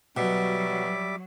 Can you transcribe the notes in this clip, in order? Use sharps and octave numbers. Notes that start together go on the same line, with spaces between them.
B2 F#3 G3 E5 D6